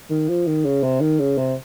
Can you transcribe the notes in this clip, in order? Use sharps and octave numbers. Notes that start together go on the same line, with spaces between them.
D#3
F3
D#3
C#3
C3
D#3
C#3
C3